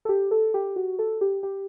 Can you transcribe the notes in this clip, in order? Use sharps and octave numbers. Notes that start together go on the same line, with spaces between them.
A4
G4
A4
G4
F#4
A4
G4
G4